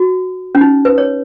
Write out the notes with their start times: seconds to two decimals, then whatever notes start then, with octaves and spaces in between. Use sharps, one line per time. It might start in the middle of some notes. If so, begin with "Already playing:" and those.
Already playing: F#4
0.55 C#4
0.61 D#4
0.85 B4
0.98 C#5